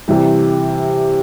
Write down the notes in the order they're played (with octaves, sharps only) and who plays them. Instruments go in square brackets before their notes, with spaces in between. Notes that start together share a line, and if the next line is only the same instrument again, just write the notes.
[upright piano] C3 E3 G3